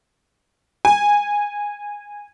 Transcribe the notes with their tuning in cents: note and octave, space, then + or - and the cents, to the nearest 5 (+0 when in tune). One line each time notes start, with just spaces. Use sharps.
G#5 -15